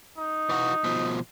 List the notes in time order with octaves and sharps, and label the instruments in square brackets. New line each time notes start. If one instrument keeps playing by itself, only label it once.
[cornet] D#4
[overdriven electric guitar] E3 F#4
B2 F3